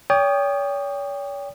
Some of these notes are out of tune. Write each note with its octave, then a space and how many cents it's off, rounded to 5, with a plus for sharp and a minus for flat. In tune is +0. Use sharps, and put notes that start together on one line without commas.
C#5 +40 G5 +25 D#6 -25